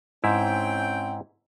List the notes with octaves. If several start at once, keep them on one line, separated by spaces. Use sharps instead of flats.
G#2 C4 C#4 E4 G5